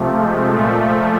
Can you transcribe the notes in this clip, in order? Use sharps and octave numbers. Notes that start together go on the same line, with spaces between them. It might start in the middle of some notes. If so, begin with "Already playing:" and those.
Already playing: C3 F3 A3
G#3
A#2 F3 A3